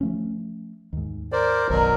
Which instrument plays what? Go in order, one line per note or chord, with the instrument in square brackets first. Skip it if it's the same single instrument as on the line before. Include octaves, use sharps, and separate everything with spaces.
[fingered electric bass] F3 A3 C#4
D#2 G#2
[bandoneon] A#4 C5 D5
[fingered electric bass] F#1 B1 D#3 [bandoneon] B2 F#3 A#4